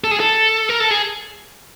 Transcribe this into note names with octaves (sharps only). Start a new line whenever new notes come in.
A4
G#4
A4
A#4
A4
G#4